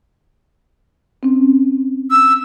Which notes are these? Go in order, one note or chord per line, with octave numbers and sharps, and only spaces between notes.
C4 C#4
E6